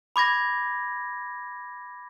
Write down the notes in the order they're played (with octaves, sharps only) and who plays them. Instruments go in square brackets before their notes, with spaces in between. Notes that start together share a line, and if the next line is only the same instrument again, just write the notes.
[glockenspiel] B5 D6 G#6 A#6